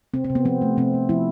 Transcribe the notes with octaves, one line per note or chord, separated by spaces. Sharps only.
C3 C4
C4
C3
B3
F3 C4
A3
C3 C4
C3
F3 E4